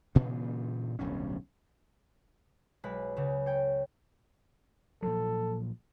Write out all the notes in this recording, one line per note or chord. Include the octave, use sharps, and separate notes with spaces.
G2 A#2 C#3 E3
D1 B1 G2 C#4
B1 G#3 B4 B5
C#2 C#3
C#5 G5
A#2 F3 F#3 A4